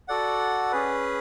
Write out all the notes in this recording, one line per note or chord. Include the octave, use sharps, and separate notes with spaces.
F#4 A4 D5 F#5
C#4 G#4 B4